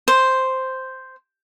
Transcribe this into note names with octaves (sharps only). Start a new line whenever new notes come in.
C5